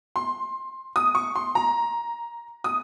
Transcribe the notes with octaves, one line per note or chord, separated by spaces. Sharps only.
C6
D#6
C#6
C6
A#5
D#6